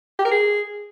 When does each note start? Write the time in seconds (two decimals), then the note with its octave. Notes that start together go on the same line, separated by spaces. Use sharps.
0.19 G4
0.25 A#4
0.31 G#4